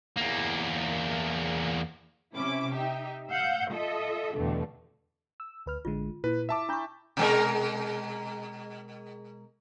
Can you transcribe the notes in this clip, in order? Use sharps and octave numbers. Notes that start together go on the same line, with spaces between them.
E2 A#3
C3 C#4 E4 D6
D#4 G4 E5
F5 F#5 E6 G6
F4 A4 D#5 E5
E2 G2 B2 D3 A3
E6
D2 B4 F6
A1 D3 G#3 F4
A#2 E4 B4
E5 A5 D6
D4 A#5 B5 C#6 G6
B2 G#3 A#4